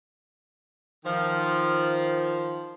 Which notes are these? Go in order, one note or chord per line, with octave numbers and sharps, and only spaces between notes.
D#3 F3